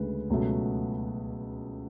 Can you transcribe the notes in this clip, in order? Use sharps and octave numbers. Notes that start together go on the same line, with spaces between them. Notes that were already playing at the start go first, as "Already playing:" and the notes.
Already playing: D2 C#3 G#3 B4
C#2 B2 F#3 A3